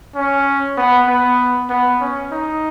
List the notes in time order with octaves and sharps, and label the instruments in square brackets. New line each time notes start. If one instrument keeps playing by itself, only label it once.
[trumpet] C#4
B3
B3
B3
C#4
D#4